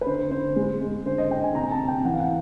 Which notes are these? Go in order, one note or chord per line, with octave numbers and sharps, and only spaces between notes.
B4
D3 C5
D3 C5
G#3
G#3
D3 C5
D#5
D3 G5
G#5
C3 A#5
A5
C3
G5
E3 F#5
F5
F#5